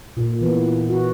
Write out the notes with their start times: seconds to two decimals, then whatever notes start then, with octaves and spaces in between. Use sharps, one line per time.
0.17 A#2
0.41 E3 B3
0.89 F#4